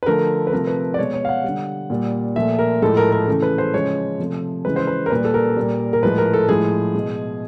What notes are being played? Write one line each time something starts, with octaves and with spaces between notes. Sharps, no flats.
B4
D3 F3 A3 A#4
B4
C3 F3 A3 A#4
B4
D5
B2 G#3 C#5
C#5
F5
F#5
D3 G3
A#2 G3
A#2 F3 A3 E5
A#4
A2 F3 G#3 A4
A#4
A#4
C#3 E3 A3
B4
C5
C#3 F3 G#3 C#5
C3 F3 A3
C#3 E3 G#3 B4
C5
B4
A#4
A#2 G3 B4
A4
A#4
A#2 G3
A#4
A2 F3 G#3 B4
A#4
A4
A2 F3 G#3 G#4
B2 G#3